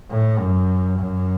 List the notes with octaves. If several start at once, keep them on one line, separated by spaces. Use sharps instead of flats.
A2
F#2
F#2